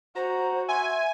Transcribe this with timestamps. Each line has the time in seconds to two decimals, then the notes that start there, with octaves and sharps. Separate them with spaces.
0.16 F#4 C5 A#5
0.68 E5 G#5 C6